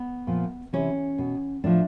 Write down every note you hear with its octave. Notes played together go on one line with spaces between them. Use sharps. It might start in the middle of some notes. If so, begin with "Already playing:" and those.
Already playing: B3
A#2 F3
C3 E3 C#4
B2
A2 F3 D4